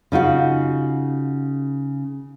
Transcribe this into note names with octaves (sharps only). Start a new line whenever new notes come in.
C#3 D#4 F4 F#4